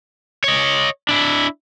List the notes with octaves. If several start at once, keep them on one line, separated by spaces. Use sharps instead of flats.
C#5 D#5
D4 E4